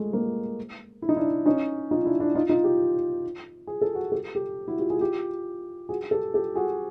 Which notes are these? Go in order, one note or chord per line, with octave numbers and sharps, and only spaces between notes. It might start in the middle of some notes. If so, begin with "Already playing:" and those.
Already playing: G#3 A3
G#3 A#3
E4
D#4
D4 E4
C#4 D#4
D#4 F4
D4 E4
D4 E4
D#4 F4
D#4 F4
F4 G4
G#4
A4
F#4 G#4
G4 A4
G4 A4
E4 F#4
F4 G4
F#4 G#4
F4 G4
F#4 G#4
G4 A4
G4 A4
F#4 G#4